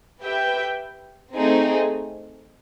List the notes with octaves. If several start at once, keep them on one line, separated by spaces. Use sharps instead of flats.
G4 B4 E5 G5
A3 C4 D#4 G#4